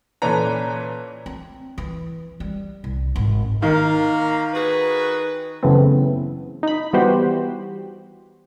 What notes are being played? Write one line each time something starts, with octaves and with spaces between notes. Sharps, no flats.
A#2 E3 C#4 A4 B4 A#5
C4
E3
G3
C2
G#1
D#3 A#3 F5
F#4 G#4 B4
F#2 C#3 E3 A3 B3 C4
D#4 B5
E3 G3 B3 F#4 G4 C5